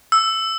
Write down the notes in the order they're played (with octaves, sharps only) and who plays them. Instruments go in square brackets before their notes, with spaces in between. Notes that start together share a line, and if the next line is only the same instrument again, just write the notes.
[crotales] E6